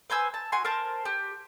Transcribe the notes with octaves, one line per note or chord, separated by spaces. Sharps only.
B4 C5 G#5 E6
A5
F#4 G#5 C6
A#4 C5 A5
G4